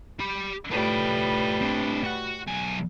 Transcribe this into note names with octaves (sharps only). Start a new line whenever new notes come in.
G4 B5
A2 G3 A3 F4 B4
C4 D4
F#4 F#5
B1 G#5